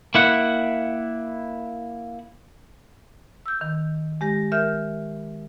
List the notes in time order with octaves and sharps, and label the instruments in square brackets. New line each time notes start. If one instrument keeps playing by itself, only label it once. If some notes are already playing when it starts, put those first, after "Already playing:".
[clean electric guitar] A#3 E4 F#5
[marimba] E6 G6
D#3
G#3 G4 A#6
A#4 E5 F6 G6